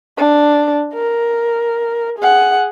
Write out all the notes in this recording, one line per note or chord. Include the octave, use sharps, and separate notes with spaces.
D4
A#4
G#4 F#5